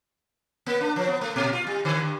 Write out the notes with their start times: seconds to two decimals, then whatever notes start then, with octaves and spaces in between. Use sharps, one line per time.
0.66 A#3
0.81 D4
0.96 F3
1.07 B3
1.21 A3
1.36 A#2
1.53 F4
1.67 G3
1.85 D3
1.99 G2